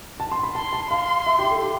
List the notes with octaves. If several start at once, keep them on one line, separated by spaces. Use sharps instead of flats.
A5
C6
B5
A5 C6
A5
F5 C6
E5
G4
A4
G4